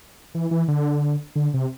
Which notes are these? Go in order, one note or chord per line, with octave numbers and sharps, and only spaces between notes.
E3
E3
D3
D3
C3